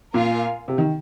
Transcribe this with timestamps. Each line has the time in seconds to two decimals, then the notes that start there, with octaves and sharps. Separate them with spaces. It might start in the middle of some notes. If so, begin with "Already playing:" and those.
0.14 A#2 F4 A#4 F5 G#5
0.68 C3
0.78 D#3